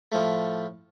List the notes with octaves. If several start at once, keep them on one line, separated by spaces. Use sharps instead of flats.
A2 F3 A3